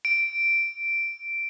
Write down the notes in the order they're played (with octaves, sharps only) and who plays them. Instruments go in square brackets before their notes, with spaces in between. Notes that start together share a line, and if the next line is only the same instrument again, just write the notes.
[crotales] D7